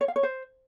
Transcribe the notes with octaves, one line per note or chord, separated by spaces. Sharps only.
C#5
F5
C#5
C5